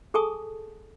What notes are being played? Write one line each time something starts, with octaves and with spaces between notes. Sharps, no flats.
G#4 A4 G#5 A5 C#6 D#6